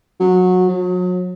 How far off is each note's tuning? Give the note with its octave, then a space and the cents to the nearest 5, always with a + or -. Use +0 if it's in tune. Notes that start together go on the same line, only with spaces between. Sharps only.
F#3 -20
F#3 -35